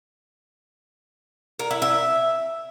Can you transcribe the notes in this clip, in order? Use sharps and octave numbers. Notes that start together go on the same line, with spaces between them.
A#4
E4
E5